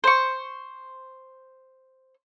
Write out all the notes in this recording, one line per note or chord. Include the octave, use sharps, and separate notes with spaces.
C5 C#6